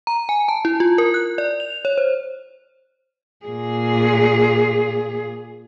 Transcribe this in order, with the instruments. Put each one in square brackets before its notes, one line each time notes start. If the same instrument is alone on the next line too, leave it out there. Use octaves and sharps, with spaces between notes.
[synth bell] A#5
G#5
A5
E4
F4
A#4
F#6
D5
F7
C#5
C5
[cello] A#2 G#4